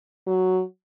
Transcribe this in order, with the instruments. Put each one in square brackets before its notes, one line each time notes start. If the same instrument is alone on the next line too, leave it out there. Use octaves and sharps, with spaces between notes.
[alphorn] F#3